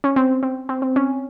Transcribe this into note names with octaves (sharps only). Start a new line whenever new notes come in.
C#4
C4
C4
C4
C4
C#4